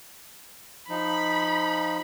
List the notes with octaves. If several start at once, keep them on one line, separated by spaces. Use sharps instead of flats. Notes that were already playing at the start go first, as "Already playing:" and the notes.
F3 D#4 B5